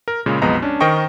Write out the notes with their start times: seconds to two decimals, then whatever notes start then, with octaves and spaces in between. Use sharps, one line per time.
0.08 A#4
0.26 A#2 C#3 G#3
0.42 B1 F2 G#3 B3 D#5 A#5
0.62 C#4 D4
0.80 D#3 A#4 C5 D#5 G5 C#6